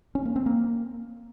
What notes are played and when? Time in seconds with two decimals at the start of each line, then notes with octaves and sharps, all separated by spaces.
0.15 C#4
0.25 A#3
0.36 C4
0.46 A#3